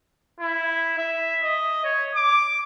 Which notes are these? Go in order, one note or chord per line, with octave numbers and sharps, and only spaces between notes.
E4
E5
D#5
C#5
D6